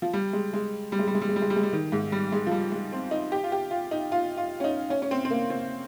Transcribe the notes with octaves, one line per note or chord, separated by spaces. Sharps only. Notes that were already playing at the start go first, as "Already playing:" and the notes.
F3
G3
G#3
G#3
G3
G#3
G3
G#3
G3
G#3
G3
G#3
G3
G#3
G3
D#3
G#2
G3
G#3
F3
G3
G#3
C4
D#4
G4
F4
G4
F4
D#4
F4
F4
C#4
D#4
C#4
C#4
C4
C4
A#3
C4